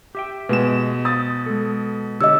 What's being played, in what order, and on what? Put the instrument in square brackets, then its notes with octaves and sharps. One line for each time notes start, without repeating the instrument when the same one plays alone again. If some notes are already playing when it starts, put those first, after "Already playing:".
[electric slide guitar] G4 E5 G5
[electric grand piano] B2 E7 [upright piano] G#3 B3
[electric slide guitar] C5 [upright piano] D#6 A6
[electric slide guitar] G#3 A4
[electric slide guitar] D3 G4 C#5 [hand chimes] D#5 E6